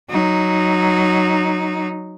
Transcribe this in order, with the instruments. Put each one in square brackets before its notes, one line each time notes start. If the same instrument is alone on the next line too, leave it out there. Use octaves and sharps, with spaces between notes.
[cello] F#3 D#4